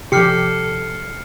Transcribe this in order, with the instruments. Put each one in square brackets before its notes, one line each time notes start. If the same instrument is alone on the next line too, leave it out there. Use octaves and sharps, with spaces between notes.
[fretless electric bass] C3 F3 [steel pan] G4 [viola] A4 [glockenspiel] F6 C7 C#7